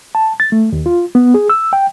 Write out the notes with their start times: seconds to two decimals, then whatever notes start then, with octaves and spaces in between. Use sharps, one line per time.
0.15 A5
0.40 A6
0.52 A3
0.73 D#2
0.86 F4
1.15 B3
1.34 G#4
1.50 E6
1.73 G5